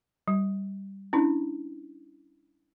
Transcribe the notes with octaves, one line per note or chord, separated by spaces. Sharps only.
G3
C#4 D4 E4